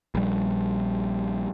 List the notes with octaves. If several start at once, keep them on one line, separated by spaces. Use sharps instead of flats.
A#1 G3